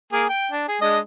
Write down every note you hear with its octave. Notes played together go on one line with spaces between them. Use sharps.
A#3 G#4
G5
D4
G#4
G#3 D4 D#5